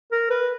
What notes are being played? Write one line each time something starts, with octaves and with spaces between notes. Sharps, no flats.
A#4
B4